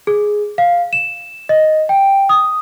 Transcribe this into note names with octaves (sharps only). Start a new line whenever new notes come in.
G#4
F5
E7
D#5
G5
D#6